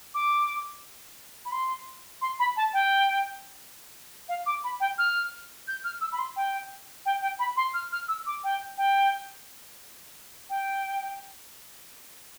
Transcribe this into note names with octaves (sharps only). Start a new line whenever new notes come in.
D6
B5
C6
C6
B5
A5
G5
F5
D6
B5
G5
F6
G6
F6
E6
B5
C6
G5
G5
G5
B5
C6
F6
F6
E6
D6
G5
G5
G5